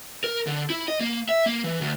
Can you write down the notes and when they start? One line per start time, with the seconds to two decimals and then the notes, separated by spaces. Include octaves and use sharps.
0.24 A#4
0.47 D3
0.70 E4
0.88 D#5
1.01 A#3
1.29 E5
1.46 A#3
1.64 E3
1.81 D2